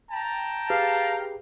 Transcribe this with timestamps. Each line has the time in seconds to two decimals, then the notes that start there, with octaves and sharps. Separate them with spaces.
0.11 G5 A5 A#5
0.70 G4 G#4 B4 F5